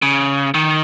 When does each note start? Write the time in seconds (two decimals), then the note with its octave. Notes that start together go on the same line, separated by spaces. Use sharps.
0.02 C#3
0.54 D#3